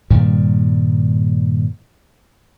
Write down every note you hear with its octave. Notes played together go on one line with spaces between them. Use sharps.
G2 A#2 D#3 G3